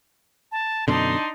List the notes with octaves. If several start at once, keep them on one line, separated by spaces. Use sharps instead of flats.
A5
F#2 B2 D3 D4 D#4 C6